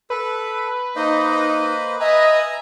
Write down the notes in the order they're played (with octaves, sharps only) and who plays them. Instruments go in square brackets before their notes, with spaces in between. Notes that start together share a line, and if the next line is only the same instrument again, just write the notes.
[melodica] A4 [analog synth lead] B4
[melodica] A#3 C5 D#5 [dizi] D#4
[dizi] D#5 [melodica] E5 G#5 A#5